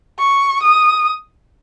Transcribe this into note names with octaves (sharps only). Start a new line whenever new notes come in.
C#6
D#6